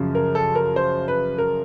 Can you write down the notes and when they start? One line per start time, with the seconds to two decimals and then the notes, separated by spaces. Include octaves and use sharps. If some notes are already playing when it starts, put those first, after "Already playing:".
Already playing: F#2 C#3 F3
0.15 A#4
0.35 A4
0.55 A#4
0.76 C5
1.08 B4
1.38 A#4